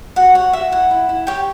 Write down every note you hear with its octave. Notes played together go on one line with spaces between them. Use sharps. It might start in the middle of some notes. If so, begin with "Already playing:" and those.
F#4 F#5
C#5 F#5
F#4 E5
E4 F#5
E4
E4
G4 C#5 G5